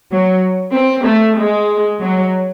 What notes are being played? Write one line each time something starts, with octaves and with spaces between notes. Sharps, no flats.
F#3
C4
A3
G#3
F#3